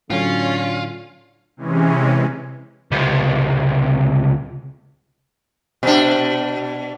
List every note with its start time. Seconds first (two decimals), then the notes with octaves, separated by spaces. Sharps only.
0.10 A2 D3 F#3 C#4 F4 C#5
1.57 C3 E3 G#3 C#4
2.92 C#2 C3
5.83 B2 D4